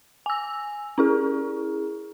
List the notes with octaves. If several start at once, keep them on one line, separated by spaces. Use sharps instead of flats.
G#5 E6
C#4 E4 G#4